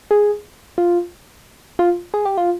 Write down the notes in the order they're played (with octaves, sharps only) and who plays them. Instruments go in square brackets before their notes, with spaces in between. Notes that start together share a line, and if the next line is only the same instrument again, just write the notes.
[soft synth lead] G#4
F4
F4
G#4
G4
F4